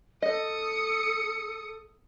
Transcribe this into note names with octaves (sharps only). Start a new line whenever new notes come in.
A4 D#5 D#6 C#7